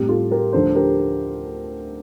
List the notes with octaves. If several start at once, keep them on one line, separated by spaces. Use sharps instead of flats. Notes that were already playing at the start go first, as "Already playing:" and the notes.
Already playing: A2 G3 C4 G4
F4 A4
G4 A#4
D2 D3 F3 A4 C5
G4 A#4